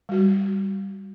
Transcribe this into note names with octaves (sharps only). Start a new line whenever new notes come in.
G3 F#4